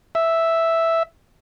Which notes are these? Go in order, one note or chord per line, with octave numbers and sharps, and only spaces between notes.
E5